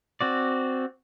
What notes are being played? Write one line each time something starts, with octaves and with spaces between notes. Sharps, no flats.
C4 F#4 D5